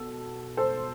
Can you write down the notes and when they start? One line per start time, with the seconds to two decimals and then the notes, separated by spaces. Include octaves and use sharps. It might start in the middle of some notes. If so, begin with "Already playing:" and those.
Already playing: B2 A4
0.57 A4 C5